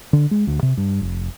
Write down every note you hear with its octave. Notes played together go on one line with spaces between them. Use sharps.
D3
G#3
D2
C3
G2
F1